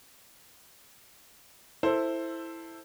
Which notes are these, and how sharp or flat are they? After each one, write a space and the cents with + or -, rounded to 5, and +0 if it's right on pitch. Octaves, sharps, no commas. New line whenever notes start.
E4 +0 A4 +15 C5 +5